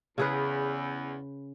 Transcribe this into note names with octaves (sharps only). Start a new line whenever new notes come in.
E2 C#3 G#4 B4